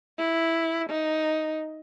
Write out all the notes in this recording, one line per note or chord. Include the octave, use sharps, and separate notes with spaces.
E4
D#4